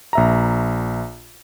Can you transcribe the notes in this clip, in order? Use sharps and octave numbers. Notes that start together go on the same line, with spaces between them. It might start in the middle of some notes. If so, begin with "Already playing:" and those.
A#1 E5 A#5